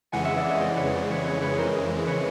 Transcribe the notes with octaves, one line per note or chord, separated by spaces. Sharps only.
F2 C#3 E3 G#3 F#5 G#5
E5 F#5
D5 E5
C#5 D#5
C5 D5
B4 C#5
C5 D5
B4 C#5
B4 C#5
B4 C#5
A#4 C5
B4 C#5